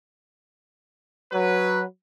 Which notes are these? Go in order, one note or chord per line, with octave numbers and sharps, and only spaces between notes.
F#3 B4